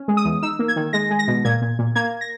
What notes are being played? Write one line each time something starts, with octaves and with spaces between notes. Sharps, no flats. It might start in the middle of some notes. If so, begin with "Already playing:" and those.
Already playing: C#4
G#3
D#6
E2
D#4 E6
A#3
G#6
D#3
G#3 A#6
G#3
A#6
B2
A#2 G#6
A#2
A#2
A#3 G#6
A#6